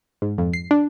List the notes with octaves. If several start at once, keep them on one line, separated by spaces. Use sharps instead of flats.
G#2
F2
C7
D4